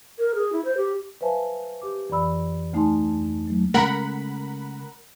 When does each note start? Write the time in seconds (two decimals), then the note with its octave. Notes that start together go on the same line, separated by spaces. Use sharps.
0.19 A#4
0.35 G#4
0.53 E4
0.65 C5
0.77 G4
1.21 B4 C5 E5 F5 G#5 A5
1.82 G4 D6
2.10 F2 E3 D5 B5 E6
2.73 D2 A3 D#4 G#5 A5 C6
3.11 F2
3.47 F#3 A3
3.74 C#3 G#3 A3 A#4 F#5 B5